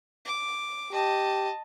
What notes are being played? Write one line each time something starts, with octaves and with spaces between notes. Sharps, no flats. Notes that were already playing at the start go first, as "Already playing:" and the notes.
D6
G4 D#5 A5